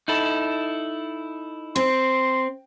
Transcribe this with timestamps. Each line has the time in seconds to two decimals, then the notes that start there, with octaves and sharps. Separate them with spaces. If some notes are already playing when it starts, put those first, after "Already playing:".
0.08 D#4 E4 A4
1.76 C4 C6